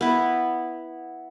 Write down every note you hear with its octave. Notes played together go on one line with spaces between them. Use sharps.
B3 E4